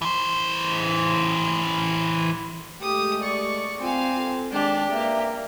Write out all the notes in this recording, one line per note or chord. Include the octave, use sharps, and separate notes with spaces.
E3 C5
G#3 A3 G4 D#6
D5 C#6
C4 F4 F5 G#5
A4
D#3 G#3 D4 G4
A#3 B4 D5 E5